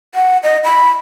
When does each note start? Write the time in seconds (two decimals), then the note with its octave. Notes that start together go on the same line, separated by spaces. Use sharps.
0.15 F#5
0.43 D#5
0.64 B5